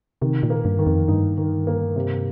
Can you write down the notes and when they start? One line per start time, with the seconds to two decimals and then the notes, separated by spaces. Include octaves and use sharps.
0.21 C3 D#3
0.43 A#2
0.50 A#3
0.65 G2
0.79 D#3
0.87 F2
1.08 G2 D#4
1.38 D#3
1.67 A#3
1.96 C3